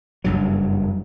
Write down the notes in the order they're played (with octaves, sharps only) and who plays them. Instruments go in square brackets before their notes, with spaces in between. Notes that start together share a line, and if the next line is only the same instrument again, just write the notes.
[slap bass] F#1 G2 F#3